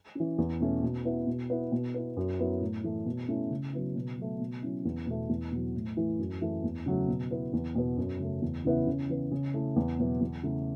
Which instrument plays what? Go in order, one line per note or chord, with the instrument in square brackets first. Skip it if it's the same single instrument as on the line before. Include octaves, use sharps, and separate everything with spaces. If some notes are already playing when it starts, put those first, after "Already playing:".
[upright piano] E3 C#4
E2
B2 A3 C#4
B2
B3 E4
B2
B3 E4
B2
B3 E4
F#2
F#3 B3 E4
A2
E3 A3
B2
A3 C#4 E4
C#3
F#3 B3 E4
B2
F#3 A3
B2
F#3 C#4 E4
E2
B2 A3
E2
B2 F#3
A2
E3 A3 E4
F#2
E3 A3
E2
C#3 F#3 A3
B2
B3 E4
E2
B2 B3
F#2
C#3 A3
E2
C#3 E3 B3 E4
C#3
E3 B3
C#3
A3 E4
E2
B2 F#3 B3 E4
E2
C#3 A3 E4